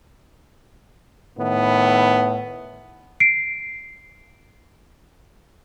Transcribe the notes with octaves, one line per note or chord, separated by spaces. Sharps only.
A2 D#3 B3
C7 D7